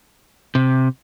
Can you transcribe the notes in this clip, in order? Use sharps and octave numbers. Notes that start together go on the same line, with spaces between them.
C3